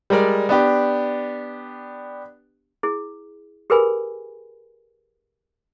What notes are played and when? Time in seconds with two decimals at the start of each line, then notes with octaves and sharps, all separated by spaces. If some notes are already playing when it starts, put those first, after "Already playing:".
0.10 G3 G#3 A#4 D5
0.49 B3 D4 G4
2.83 E4 G#4
3.70 G4 G#4 A#4 B4 G#5 B5